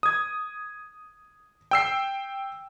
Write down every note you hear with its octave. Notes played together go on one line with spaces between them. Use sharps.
D#6 G#6
G5 E6 C7